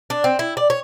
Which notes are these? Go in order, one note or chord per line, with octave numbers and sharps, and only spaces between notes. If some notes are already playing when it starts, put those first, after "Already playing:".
D4
C4
E4
D5
C#5